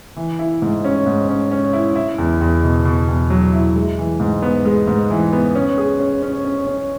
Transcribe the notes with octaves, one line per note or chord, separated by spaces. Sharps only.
E3
E4
G#2
C#4
G#2
C#4
C#4
E4
E4
E2
E2
B2
B2
E2
F#3
E4
G#3
E3
G#2
B3
G#3
G#2
E3
B3
C#4
G#4
C#4
C#4
C#4
C#4